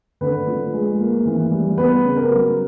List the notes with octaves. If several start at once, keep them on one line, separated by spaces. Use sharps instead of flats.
D3 B4
F3
G#3
A#3
E3
G3
B3 B4
C#3
A#4
F#3